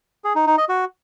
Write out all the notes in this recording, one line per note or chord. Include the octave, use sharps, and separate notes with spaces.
G#4
D#4
D#4
D#5
F#4